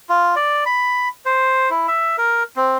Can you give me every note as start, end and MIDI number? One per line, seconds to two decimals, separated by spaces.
0.09 0.35 65
0.36 0.64 74
0.66 1.09 83
1.26 1.70 72
1.70 1.87 64
1.88 2.16 76
2.18 2.43 70
2.56 2.78 60